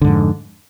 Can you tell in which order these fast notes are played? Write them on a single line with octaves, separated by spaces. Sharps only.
D3 G#2 F2